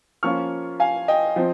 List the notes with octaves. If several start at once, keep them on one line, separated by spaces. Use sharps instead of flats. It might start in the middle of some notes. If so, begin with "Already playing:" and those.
F3 A#3 C#4 F4 C#6 F6
F5 G#5
D#5 G5
F3 C4